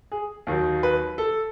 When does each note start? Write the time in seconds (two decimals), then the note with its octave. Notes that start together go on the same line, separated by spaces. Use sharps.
0.12 G#4
0.47 D#2 D#3 F#3
0.83 B4
1.18 A4